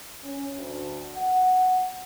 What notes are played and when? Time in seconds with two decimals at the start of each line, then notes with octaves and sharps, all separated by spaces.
0.23 C#4
0.56 D2
1.15 F#5